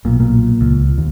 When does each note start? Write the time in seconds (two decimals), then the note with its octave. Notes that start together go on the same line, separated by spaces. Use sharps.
0.05 B1 A#2
0.20 A#2
0.61 C#2
0.98 D#2